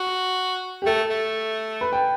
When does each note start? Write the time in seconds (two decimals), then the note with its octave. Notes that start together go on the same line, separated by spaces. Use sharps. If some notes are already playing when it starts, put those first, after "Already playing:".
Already playing: F#4
0.82 G4
0.86 A3 A4
1.10 A3
1.81 B4
1.93 G5